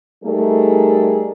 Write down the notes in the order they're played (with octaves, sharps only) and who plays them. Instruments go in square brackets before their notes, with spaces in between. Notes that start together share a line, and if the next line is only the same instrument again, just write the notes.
[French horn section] G3 A3 D#4 G#4 A#4